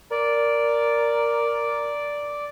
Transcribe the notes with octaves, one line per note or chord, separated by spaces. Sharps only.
A#4 D5